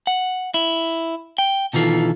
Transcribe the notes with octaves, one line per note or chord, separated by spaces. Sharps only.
F#5
E4
G5
B2 D#3 E3 F4 A4